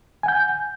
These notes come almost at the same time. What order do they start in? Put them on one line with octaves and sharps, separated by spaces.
G#5 F#5 G6